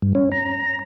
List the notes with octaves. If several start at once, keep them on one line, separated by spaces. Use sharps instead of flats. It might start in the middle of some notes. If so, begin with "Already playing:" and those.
G2
C#4
A#5